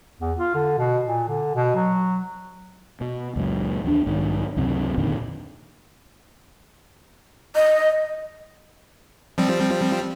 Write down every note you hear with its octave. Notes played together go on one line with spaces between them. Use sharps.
E2
F4
D3
B2
A#2
D3
B2
F#3
B2
C#2 F#2 A#2
D#2 E3 B3 D4
B1 G#2 B2 D#3
C#2 F#2 C3 C4
F2 A#2 D3 D#3
D#5
F3 G3 C4